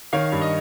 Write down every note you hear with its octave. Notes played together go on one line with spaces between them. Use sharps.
D#3 C#5 F5
G2
D#5